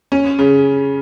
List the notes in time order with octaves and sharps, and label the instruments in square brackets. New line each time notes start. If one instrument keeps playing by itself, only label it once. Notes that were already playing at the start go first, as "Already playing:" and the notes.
[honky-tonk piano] C#4
C#3